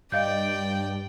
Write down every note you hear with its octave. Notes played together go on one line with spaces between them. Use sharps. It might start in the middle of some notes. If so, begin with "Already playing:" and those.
G2 D5 D#5 F5 G5 G6